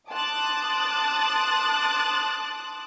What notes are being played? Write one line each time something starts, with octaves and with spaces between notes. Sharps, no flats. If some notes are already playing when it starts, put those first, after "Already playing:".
A5 C6 D6 D#6 F#6 A6